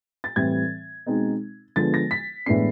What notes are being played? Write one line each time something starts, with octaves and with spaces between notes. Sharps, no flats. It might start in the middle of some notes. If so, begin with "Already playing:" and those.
A6
A2 E3 G3 C4 G#6
B2 G#3 C4 D#4
D3 F3 G#3 B3 A6
A#6
B6
A2 E3 G#3 B3 D4 C7